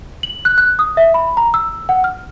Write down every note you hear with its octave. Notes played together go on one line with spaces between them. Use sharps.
F#7
F#6
F#6
D#6
E5
B5
A#5
E6
F#5
F6